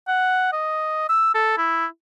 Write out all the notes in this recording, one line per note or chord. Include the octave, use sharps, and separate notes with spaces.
F#5
D#5
E6
A4
E4